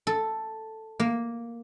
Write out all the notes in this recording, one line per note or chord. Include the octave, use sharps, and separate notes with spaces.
A4
A#3